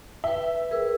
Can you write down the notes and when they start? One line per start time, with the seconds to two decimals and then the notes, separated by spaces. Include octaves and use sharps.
0.24 B4 E5 G5
0.71 G#4 A#4 B4 E6